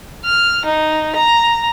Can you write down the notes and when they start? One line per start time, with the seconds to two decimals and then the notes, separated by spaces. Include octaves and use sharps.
0.25 F6
0.65 D#4
1.16 A#5